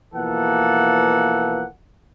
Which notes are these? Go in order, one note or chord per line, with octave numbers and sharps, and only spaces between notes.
B2 E3 F3 A#3 A4 F#5